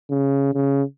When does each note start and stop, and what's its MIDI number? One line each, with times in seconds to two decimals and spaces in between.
0.10 0.53 49
0.54 0.83 49